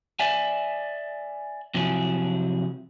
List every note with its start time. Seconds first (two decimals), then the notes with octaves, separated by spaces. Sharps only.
0.20 D5 E5 G#5
1.74 C3 F3 F#3 E4 G#4